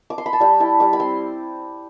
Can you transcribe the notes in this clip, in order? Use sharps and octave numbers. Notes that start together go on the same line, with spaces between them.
D6
C6
B5
A5
G3 G5
E4 A5
G3 D6
B5
C4 C6